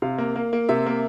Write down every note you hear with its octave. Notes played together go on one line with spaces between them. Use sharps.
C3 F5
A#3
A#3
A#3
C3 E5
A#3